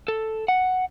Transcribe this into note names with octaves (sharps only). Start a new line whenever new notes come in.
A4
F#5